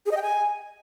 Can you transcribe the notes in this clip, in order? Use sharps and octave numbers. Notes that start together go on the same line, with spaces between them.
G#4
D#5
G5
G#5